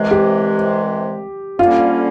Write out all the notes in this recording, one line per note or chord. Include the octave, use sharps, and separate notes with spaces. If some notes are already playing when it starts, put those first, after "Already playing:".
Already playing: C2 C3 E3 G#3
G4
F2 D3 G3 A#3 C#4 F4